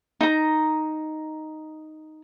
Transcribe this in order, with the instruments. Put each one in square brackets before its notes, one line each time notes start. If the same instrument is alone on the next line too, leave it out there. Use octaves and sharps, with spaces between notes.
[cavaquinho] D#4 A#5